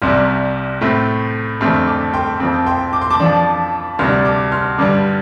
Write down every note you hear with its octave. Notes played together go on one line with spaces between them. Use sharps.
C2 C3 G3 C6 F6
A2 A3 C4
F2 D3 A3 C4 C6 F6
A5 D6
G5 C6
F2 F3 C4
G5 C6
D6
C6
A5 D6
F2 F3 D4
D2 C3 G3 D4 C6 F6
A5 D6
C6 F6
G2 D3 G3 A5 D6